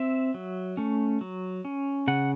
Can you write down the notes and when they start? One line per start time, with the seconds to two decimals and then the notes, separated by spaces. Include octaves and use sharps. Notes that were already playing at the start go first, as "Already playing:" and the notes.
Already playing: C4 E5
0.34 F#3
0.77 A3 C#4
1.21 F#3
1.65 C#4
2.08 C#3 F#5